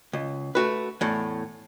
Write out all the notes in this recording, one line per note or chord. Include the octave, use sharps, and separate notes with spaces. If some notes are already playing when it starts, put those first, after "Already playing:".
C#2
A3 F#4 B4
E2 A2